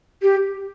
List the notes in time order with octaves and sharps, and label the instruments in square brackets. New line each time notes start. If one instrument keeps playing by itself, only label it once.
[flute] G4